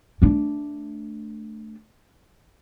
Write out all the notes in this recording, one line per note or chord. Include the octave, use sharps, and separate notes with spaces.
A3 D4